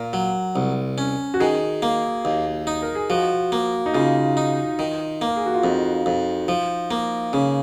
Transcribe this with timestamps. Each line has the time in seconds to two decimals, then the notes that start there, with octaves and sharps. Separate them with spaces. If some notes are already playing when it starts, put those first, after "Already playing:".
Already playing: A#2 A#4
0.13 F#3
0.56 C2
0.98 C#4
1.34 F#4
1.40 D#3 G#4
1.82 A#3
2.25 D#2
2.67 D#4
2.82 A#4
2.95 G#4
3.10 F3 F#4
3.52 A#3
3.86 D#4
3.94 C#3 F4
4.37 D#4
4.79 D#3
5.21 A#3
5.27 A#4
5.36 G#4
5.46 F#4
5.54 F4
5.64 F2 D#4
6.06 F2
6.48 F3
6.91 A#3
7.33 C#3 C#4